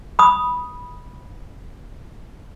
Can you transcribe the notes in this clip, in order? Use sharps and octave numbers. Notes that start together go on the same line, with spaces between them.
B5 D#6